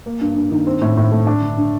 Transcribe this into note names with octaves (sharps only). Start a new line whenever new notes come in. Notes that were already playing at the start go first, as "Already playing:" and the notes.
A#3
G2
G2
D#3
C4
A2
A2
A3
D4
D3
D3